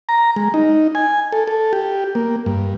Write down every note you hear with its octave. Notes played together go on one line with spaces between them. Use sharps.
A#5
G#3
D#4
G#5
A4
A4
G4
A#3
G2